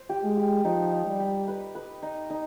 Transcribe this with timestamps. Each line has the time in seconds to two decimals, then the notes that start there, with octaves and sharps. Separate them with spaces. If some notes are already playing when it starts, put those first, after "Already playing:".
Already playing: C5
0.09 G4
0.23 G#3
0.37 G4
0.64 F3 D#4
0.92 D#4
1.06 G3
1.19 G4
1.48 B4
1.75 B4
2.02 D#4
2.30 D#4